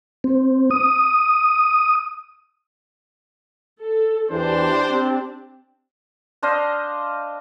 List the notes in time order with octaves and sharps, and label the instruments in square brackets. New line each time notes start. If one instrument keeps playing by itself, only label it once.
[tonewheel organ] C4
D#6
[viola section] A4
[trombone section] E2 E3 [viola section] D4 G4 [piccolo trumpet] C5
[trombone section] C4
[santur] D4 C5 D#5 F5